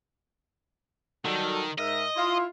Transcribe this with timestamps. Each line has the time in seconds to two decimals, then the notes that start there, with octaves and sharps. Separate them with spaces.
1.25 D#3 F#3 G3 A4
1.78 G#2 A#4 D#5 E5
2.16 E4 F4 C6